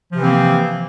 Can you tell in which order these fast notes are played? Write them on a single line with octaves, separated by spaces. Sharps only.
F3 C3 E3 C4 A#3